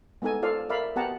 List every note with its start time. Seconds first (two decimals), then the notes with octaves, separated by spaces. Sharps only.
0.22 G#3 B3 D#4 A4 G#5
0.42 F4 A4 C5 D5 F5
0.69 A#4 D5 E5 F5 B5
0.96 B3 G4 F#5 A5 A#5